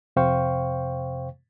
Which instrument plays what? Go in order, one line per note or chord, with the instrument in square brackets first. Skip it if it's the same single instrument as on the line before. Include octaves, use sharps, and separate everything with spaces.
[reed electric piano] F2 C3 C5 F5 G5 C#6